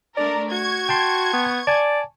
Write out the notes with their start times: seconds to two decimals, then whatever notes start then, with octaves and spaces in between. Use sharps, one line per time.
0.17 A3 D4 A#4 D5
0.52 F#4 C#6 G#6
0.89 G5 A5 C6
1.33 B3
1.67 D5 G#5 A5